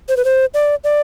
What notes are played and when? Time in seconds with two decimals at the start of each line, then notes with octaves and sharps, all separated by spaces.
0.09 C5
0.17 B4
0.25 C5
0.54 D5
0.84 D5